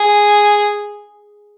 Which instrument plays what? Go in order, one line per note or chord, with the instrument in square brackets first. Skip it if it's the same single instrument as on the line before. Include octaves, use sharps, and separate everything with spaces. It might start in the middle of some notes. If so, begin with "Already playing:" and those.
Already playing: [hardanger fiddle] G#4